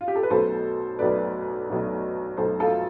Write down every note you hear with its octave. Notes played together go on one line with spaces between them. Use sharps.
F4
G4
A4
B4
B1 B2 A3 A4 C5
B1 B2 A3 B4 D5
B1 B2 A3
B1 B2 A3 A4 C5
F4 A4